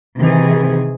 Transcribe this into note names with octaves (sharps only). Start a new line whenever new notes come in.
C3 D#3 E3 G#4